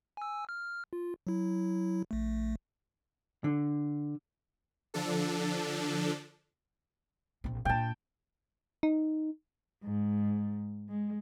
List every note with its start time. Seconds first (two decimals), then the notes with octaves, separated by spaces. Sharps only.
0.17 G#5 E6
0.49 F6
0.93 F4
1.27 F#3 E4
2.11 A#1 A3
3.44 D3
4.94 D3 F3 D4 A4
7.44 A#1 C4
7.65 A#2 D4 G5 A5
8.83 D#4
9.83 G#2
10.89 G#3